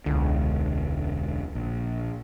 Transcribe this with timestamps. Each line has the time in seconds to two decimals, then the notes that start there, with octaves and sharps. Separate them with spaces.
0.06 E1 C#2 D3
1.55 A#1